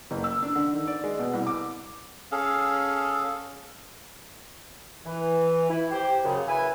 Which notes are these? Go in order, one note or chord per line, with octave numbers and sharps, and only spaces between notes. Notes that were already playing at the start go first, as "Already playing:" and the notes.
F#1
E6
D4
D3
D#3
D5
G#3
B2
C2
D6
C#4 G#4 A4 F5
E3
E4
G4 C5
F#2 C#3
E4 B4 E5 G#5